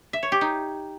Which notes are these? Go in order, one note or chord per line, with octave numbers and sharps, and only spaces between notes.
E5
C#5
G4
D#4